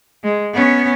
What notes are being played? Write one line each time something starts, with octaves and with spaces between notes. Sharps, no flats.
G#3
B3 C#4